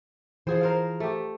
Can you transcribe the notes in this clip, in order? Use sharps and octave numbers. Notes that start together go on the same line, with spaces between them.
E3 F3 G#4 C5
A#4 C5 F5
A3 G4